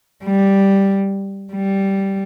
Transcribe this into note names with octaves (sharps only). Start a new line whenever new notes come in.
G3
G3